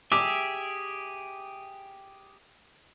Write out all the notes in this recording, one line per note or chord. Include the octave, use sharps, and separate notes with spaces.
G4 G#4 E5 D6